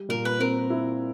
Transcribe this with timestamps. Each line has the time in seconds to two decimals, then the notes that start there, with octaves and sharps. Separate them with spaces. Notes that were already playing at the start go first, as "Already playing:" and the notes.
Already playing: G3
0.09 A#2 A#4
0.25 B4
0.39 C4 A#4
0.70 E4